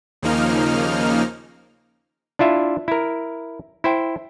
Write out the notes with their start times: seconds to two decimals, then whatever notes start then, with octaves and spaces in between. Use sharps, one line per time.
0.22 D#2 C#3 F3 A#3 D#4 F6
2.39 D4 E4 F4 E5
2.88 E4 A#4
3.84 E4 C5 G5